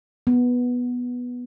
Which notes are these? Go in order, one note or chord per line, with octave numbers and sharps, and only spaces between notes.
B3